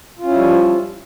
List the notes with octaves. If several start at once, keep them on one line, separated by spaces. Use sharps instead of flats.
F3 G3 C#4 E4 F4